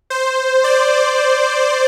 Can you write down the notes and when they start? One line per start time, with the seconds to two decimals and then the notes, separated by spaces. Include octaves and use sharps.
0.10 C5
0.64 D5